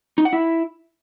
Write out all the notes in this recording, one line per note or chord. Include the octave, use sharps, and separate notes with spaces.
D#4
F#5
E4